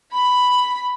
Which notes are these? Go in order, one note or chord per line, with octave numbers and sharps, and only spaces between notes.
B5